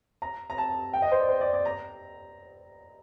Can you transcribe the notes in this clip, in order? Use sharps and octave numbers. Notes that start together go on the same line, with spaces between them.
A#5
A#5
A5
G5
D#5
C5
D5
C5
D5
D5
A#5